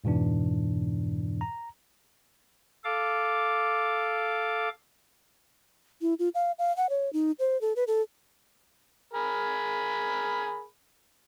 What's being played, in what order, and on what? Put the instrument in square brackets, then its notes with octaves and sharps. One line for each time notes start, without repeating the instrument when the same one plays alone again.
[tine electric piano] F2 G#2 B2 E3 D4
A#5
[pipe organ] A4 F5 D6
[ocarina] E4
F4
F5
F5
F#5
C#5
D#4
C5
A4
B4
A4
[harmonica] G#4 A#4 B5